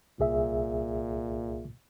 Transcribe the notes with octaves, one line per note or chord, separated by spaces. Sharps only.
C2 A#2 G#4 E5